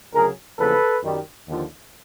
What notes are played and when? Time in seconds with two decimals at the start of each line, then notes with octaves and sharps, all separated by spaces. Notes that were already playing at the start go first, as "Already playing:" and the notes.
0.14 D2 C#3 F#3 G#4 A#4
0.59 E2 C#3 F3 A#3 A4 B4
1.03 F#2 D#3 G3
1.48 D#2 D3 F3